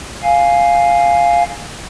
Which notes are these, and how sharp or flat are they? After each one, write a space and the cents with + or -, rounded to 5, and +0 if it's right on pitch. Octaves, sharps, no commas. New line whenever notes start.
F5 +0 G#5 +0